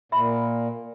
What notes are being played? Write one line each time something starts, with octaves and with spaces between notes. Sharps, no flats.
A#2 E5 B5